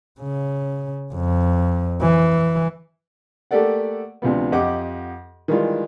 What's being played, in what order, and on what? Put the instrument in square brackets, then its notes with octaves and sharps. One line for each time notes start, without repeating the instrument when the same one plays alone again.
[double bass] C#3
F2
E3
[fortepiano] A3 A#3 G4 A4 D5 F#5
D2 C3 F3 B3
F2 G4 D#5 F#5 D6
D#3 E3 G3 G#3 F4